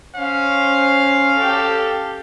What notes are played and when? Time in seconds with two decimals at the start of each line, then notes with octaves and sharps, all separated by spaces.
0.16 C#4 C5 F5
1.36 G4 A4